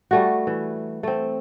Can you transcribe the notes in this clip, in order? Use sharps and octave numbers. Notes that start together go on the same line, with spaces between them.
G3 A3 F#4
E3
A3 C4